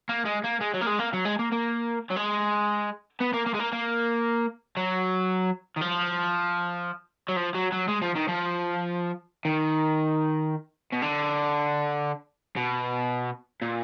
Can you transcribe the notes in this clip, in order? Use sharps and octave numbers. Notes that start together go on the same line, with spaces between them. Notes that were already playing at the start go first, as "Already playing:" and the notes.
A#3
G#3
A#3
G#3
F#3
A#3
G#3
A#3
F#3
G#3
A#3
A#3
F#3
G#3
B3
A#3
A#3
G#3
A#3
A#3
F#3
D#3
F3
F#3
F3
F#3
F#3
G#3
F3
D#3
F3
D#3
B2
D3
B2
A#2